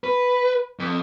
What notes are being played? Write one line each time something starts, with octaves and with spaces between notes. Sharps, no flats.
B4
F2